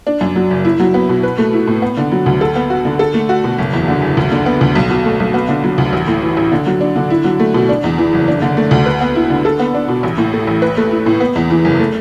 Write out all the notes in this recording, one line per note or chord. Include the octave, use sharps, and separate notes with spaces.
D4
F#2
F#3
F#1
E4
F#3
B3
B2
B4
A3
E4
A2
B3
D3
F#3
D2
A4
B3
F#4
D3
A4
A3
F#4
B2
F#1
E2
D3
F#1
D2
D3
B3
D2
B1
B2
A3
B1
B3
D3
F#3
D2
A1
A2
E3
A1
D3
F#3
D4
D3
E4
F#3
A3
B2
D4
E2
E3
F#1
D4
D3
A3
D2
B4
B3
E4
D3
A4
B3
D4
B2
A1
A2
A3
A1
B4
A3
E4
A2
B3
E2
E3
F#1
A3